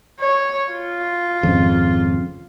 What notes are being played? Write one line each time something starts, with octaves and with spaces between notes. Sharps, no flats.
C#5
F4
G#1 F2 C#3